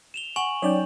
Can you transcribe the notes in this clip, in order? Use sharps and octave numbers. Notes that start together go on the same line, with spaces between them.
E7 F7 G7
F#5 G#5 C#6 F#7
F#3 C#4 D#4 C#5 D5 G5